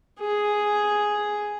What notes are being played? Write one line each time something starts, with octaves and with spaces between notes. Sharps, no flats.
G#4